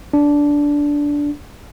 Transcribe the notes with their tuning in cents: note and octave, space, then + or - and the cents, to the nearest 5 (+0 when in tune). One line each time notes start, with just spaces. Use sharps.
D4 -10